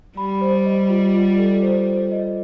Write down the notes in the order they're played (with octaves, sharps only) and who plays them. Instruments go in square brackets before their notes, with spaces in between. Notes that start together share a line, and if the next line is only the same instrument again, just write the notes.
[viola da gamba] G3 [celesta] B5
[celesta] C5
D#5
F4
F4
A4
C5
C5
D#5